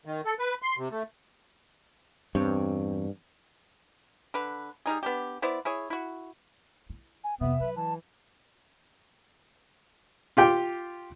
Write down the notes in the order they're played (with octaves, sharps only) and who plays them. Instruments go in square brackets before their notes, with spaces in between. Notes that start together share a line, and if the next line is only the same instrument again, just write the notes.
[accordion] D#3
A4
B4
C6
C3
A3
[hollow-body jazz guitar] E2 C4 C#5 [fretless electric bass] G2
[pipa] D3 B4
G3 G#3 D#4 G#4
B3 D4 G4
B3 E4 C5 D5
E4 G#4 C#5
E4 F#4
[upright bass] E4
[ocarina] G#5
[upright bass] F2 C3 [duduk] B3 [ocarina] E5
[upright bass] F#3 [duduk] B4
[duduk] E3 [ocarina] A5
[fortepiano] F4 G4 G5